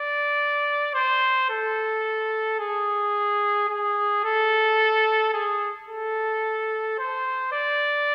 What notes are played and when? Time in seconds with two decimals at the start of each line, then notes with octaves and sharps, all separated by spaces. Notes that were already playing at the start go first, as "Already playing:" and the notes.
Already playing: D5
0.94 C5
1.50 A4
2.60 G#4
3.69 G#4
4.24 A4
5.34 G#4
5.88 A4
6.99 C5
7.53 D5